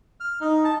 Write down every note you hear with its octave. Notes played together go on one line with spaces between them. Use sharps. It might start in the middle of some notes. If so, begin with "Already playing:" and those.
F6
D#4
A5